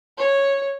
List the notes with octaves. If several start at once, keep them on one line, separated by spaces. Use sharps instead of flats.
C#5